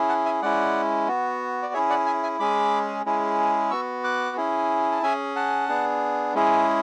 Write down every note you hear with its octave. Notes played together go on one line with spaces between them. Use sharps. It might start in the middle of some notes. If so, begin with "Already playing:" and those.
Already playing: C#4 E4 G#4
F#5 A5
E5 G#5
G#3 C#4 E4 D5 F#5
B3 F#4
D5
C#4 E4 G#4 C#5 E5
D5 F#5
E5 G#5
E5 G#5
G#3 C#4 G#4 B5 D6
G#3 C#4 E4 G#4
B3 F#4 C#6 E6
D6 F#6
C#4 E4 G#4
A5
C#4 G#4 E5 G#5
F#5 A5
B3 D4 G#4
G#3 C#4 E4 G#4